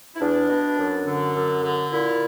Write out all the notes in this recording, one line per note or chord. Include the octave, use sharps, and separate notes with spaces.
E4
E2 D4
B2
F#2
D3
F#2
D3
A#2 E4